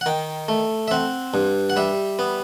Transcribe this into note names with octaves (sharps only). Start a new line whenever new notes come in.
F#5
D#3 G5
A3
E5
C4 F#5
G2
F#5
G3 E5
B3